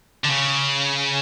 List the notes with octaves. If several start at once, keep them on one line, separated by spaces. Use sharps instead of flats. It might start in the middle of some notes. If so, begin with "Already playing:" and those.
D3
C#3